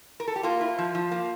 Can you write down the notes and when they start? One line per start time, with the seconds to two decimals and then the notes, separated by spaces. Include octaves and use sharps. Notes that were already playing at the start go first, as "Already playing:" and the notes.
0.20 A#4
0.28 A4
0.36 G4
0.43 A#3 F4
0.61 E4
0.78 F3
0.95 F3
1.12 A#3